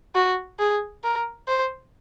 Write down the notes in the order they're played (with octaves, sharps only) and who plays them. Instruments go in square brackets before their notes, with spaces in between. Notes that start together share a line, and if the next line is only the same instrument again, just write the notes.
[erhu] F#4
G#4
A#4
C5